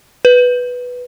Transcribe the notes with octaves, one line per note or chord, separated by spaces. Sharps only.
B4